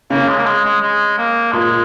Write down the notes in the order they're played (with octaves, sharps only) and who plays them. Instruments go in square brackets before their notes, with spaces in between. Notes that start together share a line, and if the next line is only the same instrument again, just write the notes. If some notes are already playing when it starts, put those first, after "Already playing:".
[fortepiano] C#3 [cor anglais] A#3
[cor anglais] G#3
A#3
G#3
G#3
G#3
A#3
[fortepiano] A#2 [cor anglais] G#3